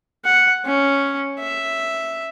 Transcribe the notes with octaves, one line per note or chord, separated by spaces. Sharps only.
F#5
C#4
E5